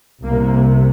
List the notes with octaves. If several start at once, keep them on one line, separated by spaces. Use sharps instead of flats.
C2 C3 A#3